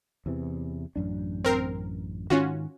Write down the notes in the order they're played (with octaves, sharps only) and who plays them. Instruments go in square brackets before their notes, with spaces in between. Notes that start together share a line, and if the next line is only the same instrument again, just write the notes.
[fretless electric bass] E2 C3 E3
A1 F#2 D4
[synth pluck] C4 A#4 C7
[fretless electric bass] G#2 D#3 [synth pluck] C#4 F4 F#4